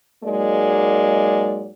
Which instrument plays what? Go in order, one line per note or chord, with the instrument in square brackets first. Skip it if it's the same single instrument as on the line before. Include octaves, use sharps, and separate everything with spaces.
[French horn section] G#2 F#3 G#3 A#3 D5